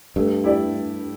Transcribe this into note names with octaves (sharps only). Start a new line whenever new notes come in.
G2 A3
E4 G4 D5